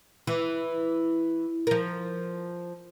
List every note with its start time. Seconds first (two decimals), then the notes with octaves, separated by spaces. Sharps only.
0.27 E3
1.67 F3 A#4